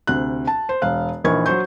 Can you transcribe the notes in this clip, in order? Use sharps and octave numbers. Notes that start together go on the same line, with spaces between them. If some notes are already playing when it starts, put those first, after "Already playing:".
D2 C3 F#6
A5
C5
E1 F5 F#6
A#1 E3 D#4 A#4 C#6 G#6
F#3 C5 C#6 G6